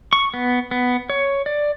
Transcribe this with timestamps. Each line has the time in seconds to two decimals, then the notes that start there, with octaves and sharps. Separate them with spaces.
0.13 C#6
0.34 B3
0.71 B3
1.10 C#5
1.46 D5